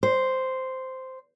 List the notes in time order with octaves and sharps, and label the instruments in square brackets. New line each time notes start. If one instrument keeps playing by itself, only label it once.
[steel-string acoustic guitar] C5